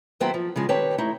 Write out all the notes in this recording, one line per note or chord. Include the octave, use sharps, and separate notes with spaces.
D#2 F#3 B3 E4 C5 G5
F3
C#3 F3 G#3
D#3 C4 G4 B4 C#5 A5
A3 D#4 E4